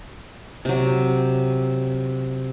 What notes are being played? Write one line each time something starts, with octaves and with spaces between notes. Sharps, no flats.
C3 F#3